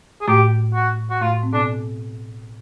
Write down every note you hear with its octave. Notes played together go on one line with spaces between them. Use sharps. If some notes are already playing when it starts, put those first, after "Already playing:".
G#4
A2 A3 G4
F#4
F#4
A2 A3 F4
C4
B2 B3 D4